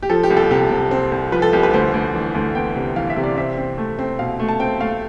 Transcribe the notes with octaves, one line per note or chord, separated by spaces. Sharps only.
G4
F3 A4
G4
C2
A4
C3 G4
C3
C4
C2
F3 B4
A4
C2 G4
B4
D2 C5
D2
E3
D2
B3 G5
C3
E3 F5
E5
C3
D5
C4 E5
C4
A3
C4
B2 F5
A3
A5
C4 G5
A3 F5